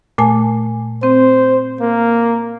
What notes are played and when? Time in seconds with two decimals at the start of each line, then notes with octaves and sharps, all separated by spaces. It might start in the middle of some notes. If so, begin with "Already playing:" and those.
0.18 A#2 A3 G#5
1.03 C4 C5
1.81 A#3